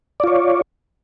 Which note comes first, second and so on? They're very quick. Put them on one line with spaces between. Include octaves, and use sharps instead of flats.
D5 F4 C#5